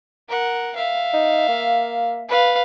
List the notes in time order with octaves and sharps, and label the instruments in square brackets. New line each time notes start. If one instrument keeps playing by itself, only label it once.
[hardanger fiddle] A#4 F#5
E5 F5
[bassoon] D#4
A#3
[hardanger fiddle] B4 F5